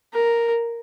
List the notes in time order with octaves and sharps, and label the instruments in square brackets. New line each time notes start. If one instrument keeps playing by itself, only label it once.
[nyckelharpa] A#4